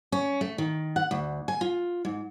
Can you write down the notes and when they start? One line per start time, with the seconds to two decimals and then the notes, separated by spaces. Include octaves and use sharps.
0.12 C#4
0.41 A3
0.58 D#3
0.96 F#5
1.11 D2
1.48 G#5
1.61 F4
2.05 G#2